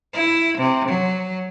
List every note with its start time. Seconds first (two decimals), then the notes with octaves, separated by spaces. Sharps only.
0.14 E4
0.58 C3
0.88 F#3